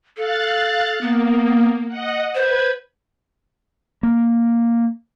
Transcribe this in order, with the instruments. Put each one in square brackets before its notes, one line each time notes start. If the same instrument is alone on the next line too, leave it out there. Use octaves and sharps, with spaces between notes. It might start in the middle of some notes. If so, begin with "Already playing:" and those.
[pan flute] A4 [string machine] F5 F#6 A6
[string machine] A#3 [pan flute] B3
[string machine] D#5 F#5
[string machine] B4 G#6 [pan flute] C5
[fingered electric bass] A#3